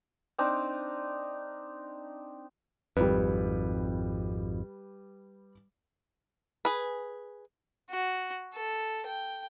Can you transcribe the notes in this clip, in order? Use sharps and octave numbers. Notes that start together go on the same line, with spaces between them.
C4 D4 D#4
G#1 F2 G3 B4
G#4 B4
F#4
A4
G5